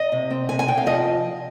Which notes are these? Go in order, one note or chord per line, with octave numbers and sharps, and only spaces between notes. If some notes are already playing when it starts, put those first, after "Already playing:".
Already playing: D#5
C3
C4
C3 G#5
G#5
C3 G5
F5
F3 D#5